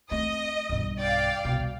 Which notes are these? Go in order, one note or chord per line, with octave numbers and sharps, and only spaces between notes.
A3 C4 D#5
B1 G2
D5 F5 G5
C2 B2